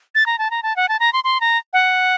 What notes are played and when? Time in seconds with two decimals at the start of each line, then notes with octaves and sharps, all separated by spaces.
0.15 A6
0.26 A#5
0.39 A5
0.51 A#5
0.63 A5
0.76 F#5
0.89 A5
1.00 A#5
1.13 C6
1.24 C6
1.41 A#5
1.73 F#5